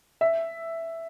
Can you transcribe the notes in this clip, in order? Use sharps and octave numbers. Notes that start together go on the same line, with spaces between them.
E5